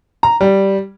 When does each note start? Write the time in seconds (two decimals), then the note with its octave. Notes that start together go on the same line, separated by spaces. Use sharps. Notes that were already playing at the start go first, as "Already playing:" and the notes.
0.23 A#5
0.41 G3